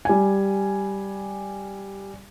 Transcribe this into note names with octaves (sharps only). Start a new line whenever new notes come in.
G3 G#5